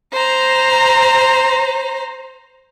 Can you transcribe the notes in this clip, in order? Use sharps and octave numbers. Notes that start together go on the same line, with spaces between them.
C5 A#5